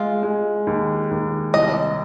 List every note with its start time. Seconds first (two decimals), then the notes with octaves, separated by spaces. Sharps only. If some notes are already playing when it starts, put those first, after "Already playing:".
Already playing: G#3 F4
0.23 G#3
0.67 D#2
1.11 D#2
1.54 C2 D#5